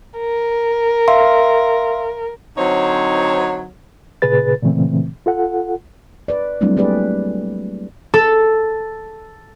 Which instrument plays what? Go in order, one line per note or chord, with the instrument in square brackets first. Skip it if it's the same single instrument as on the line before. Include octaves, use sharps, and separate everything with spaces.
[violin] A#4
[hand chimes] E5 F5 C6
[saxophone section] D3 F#3 C4 D#4 C5 C#5
[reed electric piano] A#2 C#3 G#4 B4 A6
A#2 C#3 E3 A3 C4
F4 A4 F#5
[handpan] B4 D5
F#3 G3 A3 C4 D4 E4
A#3 G4 G#4 B4 D5
[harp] A4